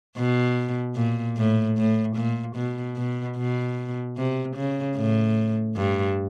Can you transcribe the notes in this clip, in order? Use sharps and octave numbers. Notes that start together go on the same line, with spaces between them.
B2
A#2
A2
A2
A#2
B2
B2
B2
C3
C#3
A2
G2